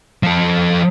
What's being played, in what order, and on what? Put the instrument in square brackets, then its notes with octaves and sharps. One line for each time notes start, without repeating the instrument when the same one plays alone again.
[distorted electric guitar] F3 A4